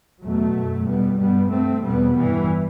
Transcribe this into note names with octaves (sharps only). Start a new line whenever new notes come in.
E2 B2 F#3 A3
F#2
E2 B2 G3 B3
G2 G3 B3
G2 A3 C4
E2 B2 G3 B3
G2 E3 G3